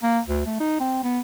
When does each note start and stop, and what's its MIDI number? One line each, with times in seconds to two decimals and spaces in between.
0.03 0.20 58
0.28 0.42 38
0.46 0.56 57
0.60 0.79 63
0.80 0.99 60
1.04 1.20 59